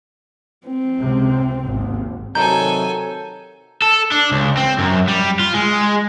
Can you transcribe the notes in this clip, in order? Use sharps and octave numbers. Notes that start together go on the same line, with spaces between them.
C4
C#2 C3
G#1 D#2
C3 D#3 F#3 A4 G#5 A#5 G6
A4
D4
C#2
C4
F#2
G3
F4
G#3